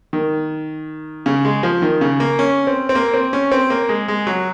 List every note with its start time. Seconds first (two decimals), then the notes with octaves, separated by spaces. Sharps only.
0.13 D#3
1.26 C#3
1.45 G#3
1.63 F3
1.82 D#3
2.01 C#3
2.20 A#3
2.39 C#4
2.67 C4
2.89 C4
2.95 A#3
3.14 C4
3.33 C#4
3.52 C4
3.70 A#3
3.89 G#3
4.08 G#3
4.27 F#3